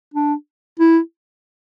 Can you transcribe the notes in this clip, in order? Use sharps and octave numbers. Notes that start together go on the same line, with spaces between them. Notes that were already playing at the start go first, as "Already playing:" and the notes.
D4
E4